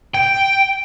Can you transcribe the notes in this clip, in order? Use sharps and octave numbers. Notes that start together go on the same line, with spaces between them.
G5